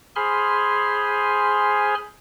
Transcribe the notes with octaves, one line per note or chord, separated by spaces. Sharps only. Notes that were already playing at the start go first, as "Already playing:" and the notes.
G#4 C5 G#5 B5 C6 F6